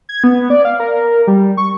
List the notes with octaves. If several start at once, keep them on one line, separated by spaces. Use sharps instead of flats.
G#6
B3
D5
F5
A#4
G3
C#6